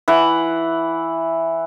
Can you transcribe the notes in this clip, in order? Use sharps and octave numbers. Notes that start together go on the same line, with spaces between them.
E3 F#5